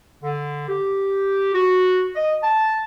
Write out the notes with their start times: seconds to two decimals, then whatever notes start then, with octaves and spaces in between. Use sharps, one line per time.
0.23 D3
0.69 G4
1.54 F#4
2.16 D#5
2.43 A5